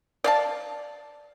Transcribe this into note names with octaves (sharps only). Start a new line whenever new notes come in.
D5 F5 A5